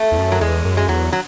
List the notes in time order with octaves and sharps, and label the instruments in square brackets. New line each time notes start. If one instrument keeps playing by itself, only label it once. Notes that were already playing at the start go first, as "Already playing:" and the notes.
Already playing: [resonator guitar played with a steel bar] A3
[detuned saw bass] E2
F#2
[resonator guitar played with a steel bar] F#3
[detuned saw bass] E2 [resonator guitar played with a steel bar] G#3
[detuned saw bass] F#2
[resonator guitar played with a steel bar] G#3
[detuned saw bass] E2 [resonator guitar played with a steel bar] F#3
[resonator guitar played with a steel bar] F#3